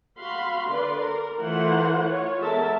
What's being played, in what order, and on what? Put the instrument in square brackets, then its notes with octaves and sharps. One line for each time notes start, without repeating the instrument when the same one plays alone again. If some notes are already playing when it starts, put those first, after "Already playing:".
[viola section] F#4 F5 B5 C6
D3 B4 D5 C6
A#4
E3 A3 F4 A#4 C5 F#5
F4 C#5
G#3 B3 A4 A#4 E5 A5